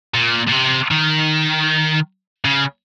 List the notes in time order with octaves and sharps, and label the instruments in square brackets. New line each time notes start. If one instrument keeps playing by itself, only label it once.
[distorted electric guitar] A#2
A#2
C3
D#3
C#3